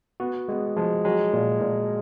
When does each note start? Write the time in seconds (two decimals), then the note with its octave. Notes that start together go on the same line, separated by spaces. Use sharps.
0.20 B3 F#4
0.48 G#3 B3
0.76 F3 G#3
1.05 F#3 G#3
1.33 A#2
1.61 A#2